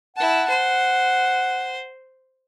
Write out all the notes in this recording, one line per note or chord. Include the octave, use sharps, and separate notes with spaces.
E4 F#5 A5
C5